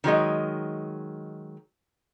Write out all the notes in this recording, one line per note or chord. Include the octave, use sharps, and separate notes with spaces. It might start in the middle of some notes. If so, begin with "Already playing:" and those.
D#3 F#3 G#3 D#5